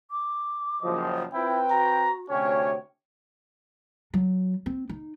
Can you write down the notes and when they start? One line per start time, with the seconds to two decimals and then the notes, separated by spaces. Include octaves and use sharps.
0.11 D6
0.82 F#1 F3 D#5
1.34 C4 E4 F4 B4 G5
1.71 F#4 A#5
2.30 D2 C3 C#4 C#5 G5
4.14 F#3
4.66 C4
4.89 D#4